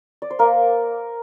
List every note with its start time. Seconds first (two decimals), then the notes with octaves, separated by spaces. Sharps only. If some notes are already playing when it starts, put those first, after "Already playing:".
0.22 D5
0.30 C5
0.39 A#3 A#4